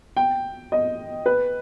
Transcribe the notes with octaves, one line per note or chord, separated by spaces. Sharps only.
G5
D#5
B4